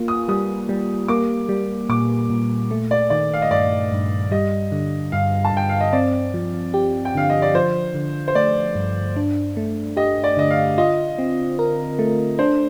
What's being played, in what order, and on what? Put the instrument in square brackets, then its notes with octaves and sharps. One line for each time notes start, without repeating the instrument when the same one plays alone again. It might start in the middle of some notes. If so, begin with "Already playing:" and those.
Already playing: [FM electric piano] A#3 F4
[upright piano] D#6
[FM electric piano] G3 [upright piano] D#6
[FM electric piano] G3
[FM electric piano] A#3 [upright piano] D6
[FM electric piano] G3
[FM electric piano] A#2 [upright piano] D6
[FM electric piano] A#2
A3
[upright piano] D5
[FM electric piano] D#3 [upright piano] D5
[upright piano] F5
D#5
[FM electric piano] G2 [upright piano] D5
[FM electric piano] G2
[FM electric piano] G3 [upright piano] D#5
[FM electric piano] D3
[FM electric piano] G2 [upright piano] F5
[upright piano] A5
[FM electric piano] G2 [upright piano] G5
[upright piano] F5
D#5
[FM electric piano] C4 [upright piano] D5
[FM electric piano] F3
G4
[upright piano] G5
[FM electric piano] D3 [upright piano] F5
[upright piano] D#5
D5
[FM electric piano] F3 [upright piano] C5
[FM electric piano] D3
[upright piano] C5
[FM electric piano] A3 [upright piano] D5
[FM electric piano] G2
D4
A3
[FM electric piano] G4 [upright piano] D#5
[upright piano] D5
[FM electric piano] D3 [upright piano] D#5
[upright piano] F5
[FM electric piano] F4 [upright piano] D#5
[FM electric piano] C4
A#4
A3
[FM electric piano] D4 [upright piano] C5